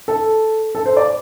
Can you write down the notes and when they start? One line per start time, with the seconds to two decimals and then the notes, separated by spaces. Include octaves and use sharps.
0.08 A4
0.75 A4
0.86 C5
0.97 D5